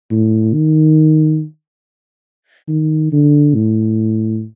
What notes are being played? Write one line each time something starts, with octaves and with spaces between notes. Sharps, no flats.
A2
D#3
D#3
D3
A2